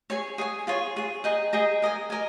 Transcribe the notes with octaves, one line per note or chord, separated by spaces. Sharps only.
G#4 C#5 G#5
G#4 C#5 G#5
F4 G#4 C#5
F4 G#4 C#5
G#4 D#5 G5 A#5
G#4 D#5 G5 A#5
A#4 D#5 G#5
A#4 D#5 G#5